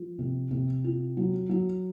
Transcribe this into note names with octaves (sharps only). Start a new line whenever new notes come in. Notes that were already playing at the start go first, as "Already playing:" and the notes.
Already playing: F3
C3
C3
F4
F#3
F#3